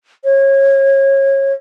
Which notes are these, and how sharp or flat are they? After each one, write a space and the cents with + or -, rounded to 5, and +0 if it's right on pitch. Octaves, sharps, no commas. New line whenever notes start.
C#5 -25